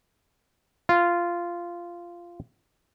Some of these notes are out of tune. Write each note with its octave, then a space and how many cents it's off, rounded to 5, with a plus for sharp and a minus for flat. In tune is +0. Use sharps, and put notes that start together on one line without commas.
F4 -10